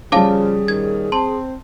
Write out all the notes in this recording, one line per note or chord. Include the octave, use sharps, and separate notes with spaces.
C#3 F3 G3 C#4 G#4 F5 A5 D6
A#2 D#3 G#6
C4 A5 C6